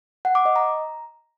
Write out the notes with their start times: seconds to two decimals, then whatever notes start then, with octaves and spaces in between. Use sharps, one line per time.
0.25 F#5
0.35 D6
0.45 D#5
0.56 A#5